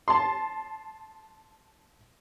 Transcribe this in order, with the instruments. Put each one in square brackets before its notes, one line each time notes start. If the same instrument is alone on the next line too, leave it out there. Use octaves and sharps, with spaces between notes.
[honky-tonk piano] A5 C6